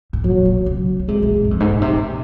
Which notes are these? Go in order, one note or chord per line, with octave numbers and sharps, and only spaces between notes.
G#2
A#2 F#3
C3
C#3
C#3
C3 G#3
A#2
G#2
F#2
F2
G#2
A#2
C3
A#2